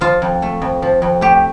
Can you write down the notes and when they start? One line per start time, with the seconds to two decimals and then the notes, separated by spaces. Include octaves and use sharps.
0.01 F3 F4
0.22 F2
0.42 A3
0.62 F2
0.82 F3
1.02 F2
1.21 A3 G4